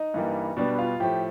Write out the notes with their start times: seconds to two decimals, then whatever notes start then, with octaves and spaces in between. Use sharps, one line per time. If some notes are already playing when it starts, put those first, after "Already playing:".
Already playing: D#4 D#5
0.14 G2 E3 G3 A#3
0.57 B2 G3 B3 D4 D5
0.78 F4 F5
1.00 A2 F3 A3 G4 G5